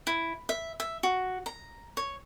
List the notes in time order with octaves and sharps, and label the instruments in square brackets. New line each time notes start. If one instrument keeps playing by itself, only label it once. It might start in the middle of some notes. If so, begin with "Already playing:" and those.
[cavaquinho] E4
E5
E5
F#4
A#5
C#5